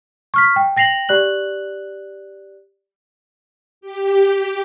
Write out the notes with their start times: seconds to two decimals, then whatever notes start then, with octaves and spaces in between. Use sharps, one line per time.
0.34 C#6 F6 B6
0.56 G5
0.77 G5 A#6 C7 F7 F#7
1.09 G4 D5 F#6 F#7
3.81 G4